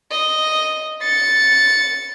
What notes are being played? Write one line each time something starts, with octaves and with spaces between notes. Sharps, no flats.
D#5
A6 C#7